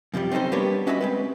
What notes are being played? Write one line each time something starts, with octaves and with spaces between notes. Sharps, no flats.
F#2 C3 F3 G3
C4 C#4 D#4 A4 C5
G3 A#3 B3 D4 G4 C#5
C#4 F#4 D#5 E5 A5 B5
G#3 C4 B4